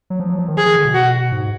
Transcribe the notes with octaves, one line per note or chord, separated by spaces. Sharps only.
F#3
F3
F#3
F3
D#3
F3 G#4
D#3
D3
B2
F#4
G#2